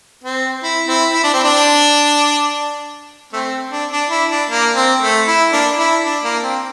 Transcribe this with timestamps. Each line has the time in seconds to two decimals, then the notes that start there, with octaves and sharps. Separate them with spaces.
0.24 C4
0.63 E4
0.88 C4 E4
1.14 E4
1.23 D4
1.34 C4
1.44 D4
3.33 A3 C4
3.72 D4
3.92 D4
4.11 E4
4.30 D4
4.50 A#3
4.76 C4
5.02 A3
5.27 E4
5.53 A#3 D4
5.79 E4
6.05 D4
6.24 A#3
6.44 C4